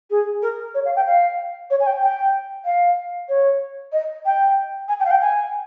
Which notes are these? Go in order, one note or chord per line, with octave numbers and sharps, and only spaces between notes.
G#4
A#4
C#5
F5
G5
F5
C#5
G#5
G5
G5
F5
C#5
D#5
G5
G#5
G5
F5
G5
G#5